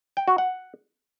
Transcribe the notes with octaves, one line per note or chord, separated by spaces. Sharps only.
G5
F#4
F#5